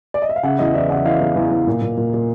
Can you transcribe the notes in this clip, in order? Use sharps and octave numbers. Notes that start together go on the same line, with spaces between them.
D5
D#5
E5
F5
C#3 E5 F#5
E2 D#5
E3 D5 E5
C#3 E5 F#5
E3 D#5 F5
E2
E2
E2
A#2
A#2
A#2
A#2